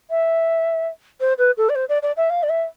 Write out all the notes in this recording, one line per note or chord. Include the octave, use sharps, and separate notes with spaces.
E5
C5
B4
A4
D5
C5
D5
D5
E5
F5
D5
E5